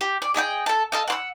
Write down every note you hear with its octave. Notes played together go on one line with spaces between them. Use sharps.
G4
D5
G#4 D#5 E5 G5
A4 A5
A4 D#5 F5
F#5 C6 E6